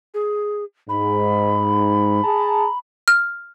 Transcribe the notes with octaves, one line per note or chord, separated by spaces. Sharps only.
G#4
G#2 B5
G#4 A5 A#5
F6